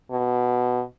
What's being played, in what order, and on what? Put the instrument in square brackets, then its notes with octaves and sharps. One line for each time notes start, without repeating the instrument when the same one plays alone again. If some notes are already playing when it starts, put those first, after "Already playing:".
[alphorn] B2